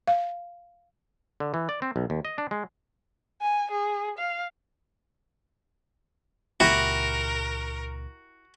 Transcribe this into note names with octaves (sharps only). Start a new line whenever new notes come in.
F5
D3
E3
D5
C4
B1
D#2
D#5
D4
G#3
G#5
G#4
F5
C#2 A#2 E4 F#4 G4 A#4